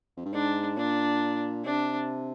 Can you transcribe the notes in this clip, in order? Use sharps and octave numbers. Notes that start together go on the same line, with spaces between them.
F2
G2
G#2 D4
A#2 D4
C3 D4